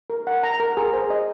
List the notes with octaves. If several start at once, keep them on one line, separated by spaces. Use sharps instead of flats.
A#4
F#5
A#5
A#4
G#4
C5
D#5